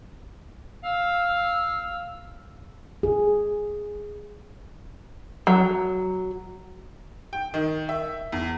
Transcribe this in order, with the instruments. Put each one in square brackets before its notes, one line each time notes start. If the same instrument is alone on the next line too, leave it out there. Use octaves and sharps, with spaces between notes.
[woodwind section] F5 E6
[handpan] G#4
[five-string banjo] F#3
[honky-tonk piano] G5
D#3
E5
E2